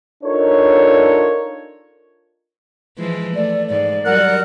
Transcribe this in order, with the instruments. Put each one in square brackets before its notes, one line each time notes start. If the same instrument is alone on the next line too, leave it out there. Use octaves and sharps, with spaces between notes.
[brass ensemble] D4 D#4 F4 A4 A#4 C#5
[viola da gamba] E3 F3 G#3
[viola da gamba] A3 [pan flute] D5
[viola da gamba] G#2 [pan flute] D5
[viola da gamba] F#3 G3 [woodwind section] A#4 F#5